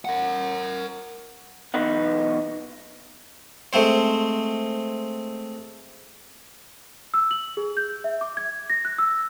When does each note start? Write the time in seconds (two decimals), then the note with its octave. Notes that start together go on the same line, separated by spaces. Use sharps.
0.05 A#4 F#5
1.74 B1 E2 B3 D#4 B4 F#5
3.73 G#3 A3 C4 C5
7.14 E6
7.31 F#7
7.57 G#4
7.77 G6
8.04 E5
8.21 D6
8.37 G#6
8.70 A#6
8.85 F#6
8.98 E6